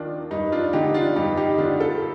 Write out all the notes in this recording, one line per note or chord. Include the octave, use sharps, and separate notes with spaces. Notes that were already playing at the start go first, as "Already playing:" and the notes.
Already playing: D#2 D#3 D4 F4
G2 D#4
D4 F4
D3 D#4 G4
D4 F4
G2 D#4 G4
D#4 G4
D3 D4 F4
F4 A4